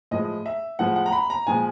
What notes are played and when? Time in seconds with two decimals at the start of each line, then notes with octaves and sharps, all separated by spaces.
0.11 A2 F3 G#3 D#5
0.46 E5
0.79 A2 F3 G#3 F#5
0.96 F#5
1.06 A#5
1.13 B5
1.30 A#5
1.47 A#2 F3 G#3 G#5